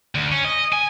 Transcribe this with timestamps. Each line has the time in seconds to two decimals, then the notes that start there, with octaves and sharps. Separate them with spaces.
0.15 D2
0.32 C#4
0.45 D#5
0.73 G#5